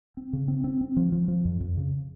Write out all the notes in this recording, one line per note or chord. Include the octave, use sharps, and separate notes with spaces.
C4
C#3
C4
C4
C4
F3
F3
F3
F2
F2
C#3